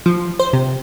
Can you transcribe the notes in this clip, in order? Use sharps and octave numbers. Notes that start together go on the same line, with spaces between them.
F3
C5
C3